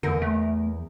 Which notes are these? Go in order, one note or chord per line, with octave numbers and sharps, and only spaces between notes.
E2 D3 A#4
A3